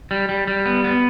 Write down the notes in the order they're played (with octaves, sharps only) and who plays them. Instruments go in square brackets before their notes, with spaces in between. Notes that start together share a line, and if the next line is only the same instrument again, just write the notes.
[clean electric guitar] G3
G3
G3
B3
B3